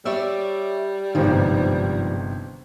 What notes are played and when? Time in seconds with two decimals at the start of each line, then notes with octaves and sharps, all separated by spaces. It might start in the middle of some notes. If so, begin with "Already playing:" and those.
0.05 G3 C#5 D5 E5
1.15 G1 G#2 C3 D#3 F3